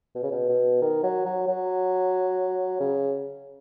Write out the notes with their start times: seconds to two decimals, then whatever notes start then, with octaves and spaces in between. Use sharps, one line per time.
0.15 B2
0.23 C#3
0.31 B2
0.49 B2
0.82 D#3
1.03 F#3
1.25 F#3
1.47 F#3
2.80 C#3